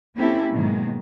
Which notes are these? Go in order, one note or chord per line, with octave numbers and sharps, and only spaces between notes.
A#3 C4 C#4 E4 G4 A4
G#2 B2 D#3 F#3 G#3 A#3